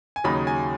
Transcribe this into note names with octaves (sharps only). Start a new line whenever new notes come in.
G#5
D#2 C#3 F#3 D#4 B5
G#5